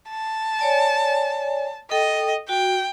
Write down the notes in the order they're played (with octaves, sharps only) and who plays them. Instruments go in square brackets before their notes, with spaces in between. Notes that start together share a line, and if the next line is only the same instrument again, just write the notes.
[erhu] A5
[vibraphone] C#5 D5 G#5
[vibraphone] A4 G5 [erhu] D#5
[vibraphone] F#4 [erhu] G5